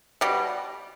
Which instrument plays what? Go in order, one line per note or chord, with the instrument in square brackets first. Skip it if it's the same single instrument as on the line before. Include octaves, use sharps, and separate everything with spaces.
[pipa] B2 G3